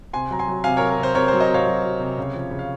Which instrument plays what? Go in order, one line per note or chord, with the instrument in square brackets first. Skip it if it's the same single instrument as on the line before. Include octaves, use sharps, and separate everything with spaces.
[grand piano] C3 G#5 C6
F#3 A#5
G#5 C6
F#3
C3 F5 G#5
F#3 A#4 C#5
A#4
C3
C5
C3 A#4 C#5
C5
F#3
C5 D#5
C3 C#5 F5
F#3
F#3
C3
C#3
F3
C#3
F5